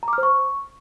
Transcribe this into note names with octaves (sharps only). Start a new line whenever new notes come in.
A#5
D6
F6
C5
C#6